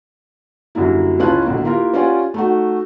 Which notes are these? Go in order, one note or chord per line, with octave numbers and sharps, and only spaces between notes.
F#2 D3 G3 A#3 E4
C#2 C#4 E4 F4 A5 F#6
B1 D3 A#3
A#3 E4 F4 G4 A#4
C#4 F4 G4 D5 F#5 G#5
A3 D#4 F#4